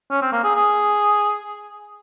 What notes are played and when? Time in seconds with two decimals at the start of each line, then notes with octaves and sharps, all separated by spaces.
0.11 C#4
0.21 C4
0.32 A#3
0.44 G#4
0.55 G#4